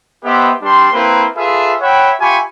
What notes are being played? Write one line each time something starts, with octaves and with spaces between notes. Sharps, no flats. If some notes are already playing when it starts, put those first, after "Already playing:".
B3 G4 B4 C5 D#5 E5
G3 D4 G4 B4 C6
A#3 C4 E4 A#4 B4
F4 G#4 A4 B4 E5
C#5 E5 F#5 G5 B5
F4 G4 E5 G#5 B5 C#6